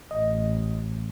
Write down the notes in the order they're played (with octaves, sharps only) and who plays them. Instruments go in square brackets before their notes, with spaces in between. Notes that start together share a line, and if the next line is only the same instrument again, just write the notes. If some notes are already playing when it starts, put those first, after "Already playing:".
[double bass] A1 [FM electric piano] D#5